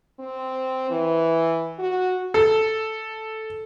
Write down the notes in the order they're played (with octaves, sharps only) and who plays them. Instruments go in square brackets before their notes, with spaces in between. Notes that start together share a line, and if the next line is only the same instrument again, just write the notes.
[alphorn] C4
E3
F#4
[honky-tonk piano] A4